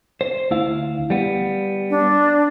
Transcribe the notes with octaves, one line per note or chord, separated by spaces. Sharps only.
C5
D2 E4 F5
G3 B3
D4